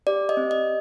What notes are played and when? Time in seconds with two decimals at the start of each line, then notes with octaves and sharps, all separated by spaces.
0.07 G4 D5
0.29 D#5
0.37 C4
0.51 D#5